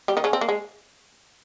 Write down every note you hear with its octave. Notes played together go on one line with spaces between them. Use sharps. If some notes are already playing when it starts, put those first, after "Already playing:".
G3 G4
D#3 D#4
C#3 C#4
C4
A#3
G#3